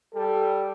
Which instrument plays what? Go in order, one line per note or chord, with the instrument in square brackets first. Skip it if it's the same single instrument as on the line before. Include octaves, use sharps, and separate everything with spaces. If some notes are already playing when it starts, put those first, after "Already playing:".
[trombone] G3 [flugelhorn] A4